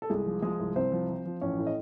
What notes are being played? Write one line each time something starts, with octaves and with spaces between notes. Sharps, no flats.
A4
C2 G#3 G#4
F3
F3 G#3 G#4
C2
C2 C4 C5
F3
F3
F3
A1 C#4 C#5
A2
D#5